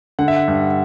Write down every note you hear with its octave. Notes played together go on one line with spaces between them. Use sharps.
D3 F#5
E5
F#5
G2